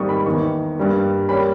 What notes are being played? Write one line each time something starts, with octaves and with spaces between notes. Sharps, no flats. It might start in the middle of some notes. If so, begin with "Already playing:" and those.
Already playing: G#1 G#2 G3 A#3 C#6 D#6
B5
E2 D#3 A#3 C#6
G2 G3 A#3
G3 A#3 C#4 B5